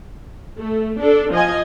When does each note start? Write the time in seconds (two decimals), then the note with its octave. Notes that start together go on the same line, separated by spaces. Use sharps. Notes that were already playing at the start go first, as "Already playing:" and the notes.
0.57 A3
1.00 D4 A4
1.32 F3 D#5 G#5